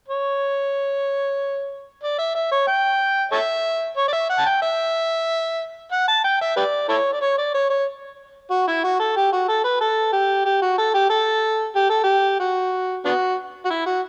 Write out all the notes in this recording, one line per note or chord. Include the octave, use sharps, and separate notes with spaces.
C#5
D5
E5
E5
C#5
G5
A4 C#5 E5
C#5
D5
E5
F#5
A5
G5
E5
F#5
A5
G5
E5
G4 B4 D5
E4 A4 C#5
D5
C#5
D5
C#5
C#5
F#4
E4
F#4
A4
G4
F#4
A4
B4
A4
G4
G4
F#4
A4
G4
A4
G4
A4
G4
F#4
B3 D4 F#4
F#4
E4
F#4